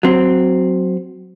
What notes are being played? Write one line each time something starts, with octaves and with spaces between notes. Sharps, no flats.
F#3 C4